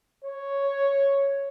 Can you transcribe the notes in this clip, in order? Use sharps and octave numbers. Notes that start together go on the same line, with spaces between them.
C#5